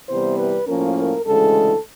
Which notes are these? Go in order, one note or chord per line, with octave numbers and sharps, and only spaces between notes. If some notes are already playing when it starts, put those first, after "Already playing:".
C3 E3 G3 B3 C5
B4
A2 F3 A#3 C#4 A#4
A#4
D2 C#3 E3 G#3 A4